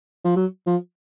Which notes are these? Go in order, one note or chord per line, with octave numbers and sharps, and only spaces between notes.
F3
F#3
F3